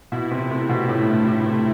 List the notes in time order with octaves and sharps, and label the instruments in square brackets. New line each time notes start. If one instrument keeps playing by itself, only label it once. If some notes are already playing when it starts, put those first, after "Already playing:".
[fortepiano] B2 [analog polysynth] E4
[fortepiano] C3
[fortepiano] C3 [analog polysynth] A3
[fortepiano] B2
[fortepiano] A2 [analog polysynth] A3
[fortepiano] G2
[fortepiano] A2 [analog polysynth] E4
[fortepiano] C3